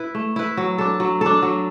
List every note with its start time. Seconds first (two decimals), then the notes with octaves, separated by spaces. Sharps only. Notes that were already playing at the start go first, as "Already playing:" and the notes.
Already playing: E4 B4
0.15 A3
0.36 E4 B4
0.57 F#3
0.78 D4 A4
1.00 F#3
1.21 D4 A4
1.42 F#3